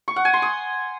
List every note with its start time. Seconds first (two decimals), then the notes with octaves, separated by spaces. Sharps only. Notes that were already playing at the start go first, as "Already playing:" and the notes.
0.08 C#6
0.16 F#5
0.25 G#5
0.34 C6
0.42 D#6